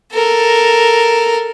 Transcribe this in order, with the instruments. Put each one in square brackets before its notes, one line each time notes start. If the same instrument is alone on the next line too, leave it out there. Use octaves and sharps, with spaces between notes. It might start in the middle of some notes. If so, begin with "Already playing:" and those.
[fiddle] A4 A#4